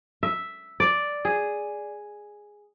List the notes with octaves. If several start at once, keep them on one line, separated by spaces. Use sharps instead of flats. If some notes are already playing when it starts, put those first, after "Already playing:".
E5
D5
G#4